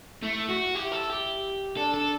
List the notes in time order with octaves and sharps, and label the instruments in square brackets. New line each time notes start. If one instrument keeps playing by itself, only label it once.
[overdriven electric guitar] A3 [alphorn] E4
[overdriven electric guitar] F#4
[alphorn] E4 [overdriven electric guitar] G4
[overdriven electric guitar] A4
G4
[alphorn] D4 [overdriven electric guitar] A4
[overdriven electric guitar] A4